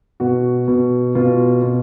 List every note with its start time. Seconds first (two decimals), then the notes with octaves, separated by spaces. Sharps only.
0.20 B2 F#4
0.68 B2
1.15 B2 F4
1.62 B2